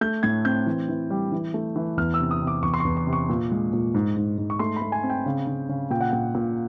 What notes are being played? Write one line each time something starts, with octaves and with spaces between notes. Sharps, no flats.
A3 G6
A2 G#6
C4 G6
E3
E3
G3
E3
A3
E3
E2 F6
E6
C3
D#6
C3
D6
E2 C#6
C6
E2 C#6
C#6
C3
C#6
A#2
G#3
A#2
G#2
G#2
G#2
C#6
A3 C6
B5
A3
G#5
C4
G5
C#3
C#3
C#3
A#2 G5
F#5
A#2 G5
A#2